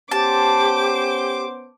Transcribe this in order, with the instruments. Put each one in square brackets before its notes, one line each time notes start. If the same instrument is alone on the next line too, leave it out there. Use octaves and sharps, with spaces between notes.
[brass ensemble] B3 C#4 C5 [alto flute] G4 [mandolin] A5 [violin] D6